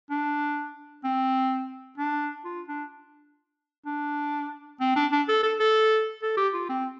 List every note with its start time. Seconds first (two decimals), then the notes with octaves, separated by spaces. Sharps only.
0.10 D4
1.04 C4
1.98 D4
2.45 F4
2.68 D4
3.86 D4
4.80 C4
4.96 D4
5.12 D4
5.28 A4
5.43 A4
5.59 A4
6.22 A4
6.37 G4
6.54 F4
6.69 C4